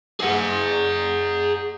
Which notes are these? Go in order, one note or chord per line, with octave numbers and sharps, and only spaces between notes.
G#4 F#5